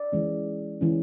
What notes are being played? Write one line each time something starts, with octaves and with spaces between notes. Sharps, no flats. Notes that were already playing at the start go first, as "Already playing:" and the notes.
Already playing: D5
E3 G#3 C#4
E3 G#3 C#4